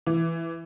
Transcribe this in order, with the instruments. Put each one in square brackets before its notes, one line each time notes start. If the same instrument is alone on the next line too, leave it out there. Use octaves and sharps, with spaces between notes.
[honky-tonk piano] E3